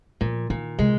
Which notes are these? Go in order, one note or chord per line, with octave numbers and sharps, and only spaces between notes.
A#2 F3
A#2 D#3
C3 G#3